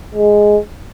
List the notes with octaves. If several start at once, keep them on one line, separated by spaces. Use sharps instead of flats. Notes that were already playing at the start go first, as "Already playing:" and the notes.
G#3